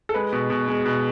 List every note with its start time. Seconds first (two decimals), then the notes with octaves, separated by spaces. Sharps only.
0.09 A4
0.14 G#3 B4
0.33 B2
0.50 B2
0.68 G#3
0.86 B2